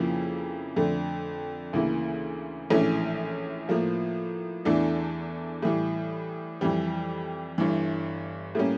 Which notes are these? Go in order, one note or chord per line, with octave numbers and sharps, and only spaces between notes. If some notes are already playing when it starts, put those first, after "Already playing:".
Already playing: F2 C#3 F3 A#3 E4
F2 D3 A3
D2 C#3 E3 A#3 E4
A#1 A2 E3 A3 C#4
A2 F3 A#3
E2 E3 A3 D4 A4
A2 E3 G3
F2 E3 G3
G1 G2 E3
A2 G3 A#3 C#4